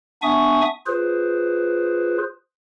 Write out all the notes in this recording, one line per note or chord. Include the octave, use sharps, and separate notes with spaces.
B3 D4 E5 G#5 C#6 D#6
F4 G#4 B4 C5